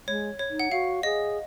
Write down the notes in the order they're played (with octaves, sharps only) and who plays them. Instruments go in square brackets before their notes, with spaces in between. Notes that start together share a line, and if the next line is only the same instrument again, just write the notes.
[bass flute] G#3 [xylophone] C#5
[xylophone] C#5
[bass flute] D#4
[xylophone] F#5
[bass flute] F#4 [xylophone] F5
[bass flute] G#4 [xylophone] D#5